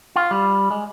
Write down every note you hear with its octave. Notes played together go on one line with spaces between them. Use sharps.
F4
G3
G#3